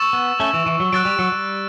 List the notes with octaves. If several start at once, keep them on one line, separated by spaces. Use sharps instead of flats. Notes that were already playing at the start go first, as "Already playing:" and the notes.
Already playing: C#6 E6 A6 E7
B3
A3 C#4
E3
E3
F#3
F#3 F#6 A6 D7
G3
F#3
G3